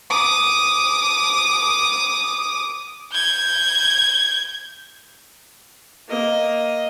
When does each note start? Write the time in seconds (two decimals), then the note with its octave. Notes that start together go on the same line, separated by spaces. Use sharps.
0.10 D6 D#6
3.12 G6 G#6
6.09 A#3 D#5